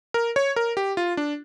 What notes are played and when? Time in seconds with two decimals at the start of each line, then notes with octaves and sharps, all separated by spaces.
0.14 A#4
0.36 C#5
0.56 A#4
0.77 G4
0.97 F4
1.17 D4